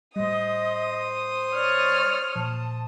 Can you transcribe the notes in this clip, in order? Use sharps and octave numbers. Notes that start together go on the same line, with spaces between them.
A2 G3 C5 D#5 D#6
C#5 D5 F6
A#2 F3 A5